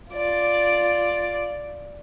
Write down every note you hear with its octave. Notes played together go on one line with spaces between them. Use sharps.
F4 D5